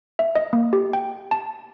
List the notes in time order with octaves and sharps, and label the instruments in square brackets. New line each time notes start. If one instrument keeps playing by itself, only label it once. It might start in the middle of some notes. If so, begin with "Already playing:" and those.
[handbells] E5
D#5
A#3
G4
G5
A5